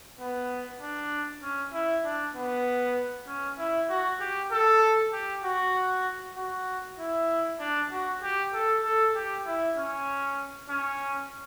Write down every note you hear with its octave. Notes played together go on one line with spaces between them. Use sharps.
B3
D4
C#4
E4
D4
B3
C#4
E4
F#4
G4
A4
G4
F#4
F#4
E4
D4
F#4
G4
A4
A4
G4
E4
C#4
C#4